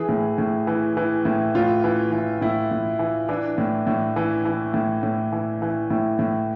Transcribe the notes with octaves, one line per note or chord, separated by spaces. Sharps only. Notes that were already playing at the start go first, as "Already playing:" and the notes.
Already playing: E3 G#4
A2
A2
E3
E3
A2
A2 F4
E3
E3
A2 E4
A2
E3
E3 D4
A2
A2
E3
E3
A2
A2
E3
E3
A2
A2